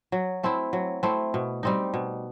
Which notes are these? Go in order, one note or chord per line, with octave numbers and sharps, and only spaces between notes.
F#3
A3 C4 E4
F#3
A3 C4 E4
B2
G3 C4 D#4
B2